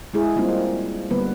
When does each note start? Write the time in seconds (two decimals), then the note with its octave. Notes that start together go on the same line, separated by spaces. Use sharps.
0.14 G#3 E4 G#4
0.36 G3 A#3 C4 D#4 F4
1.10 D3 G3 A#3 B3 B4